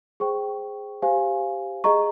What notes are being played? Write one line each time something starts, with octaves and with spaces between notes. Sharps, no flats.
G#4 C5 G5 C#6
G4 C5 F5 G#5
G#4 D#5 A#5 C#6